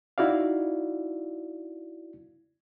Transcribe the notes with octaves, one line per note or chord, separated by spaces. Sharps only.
D#4 E4 F#4 D5 F5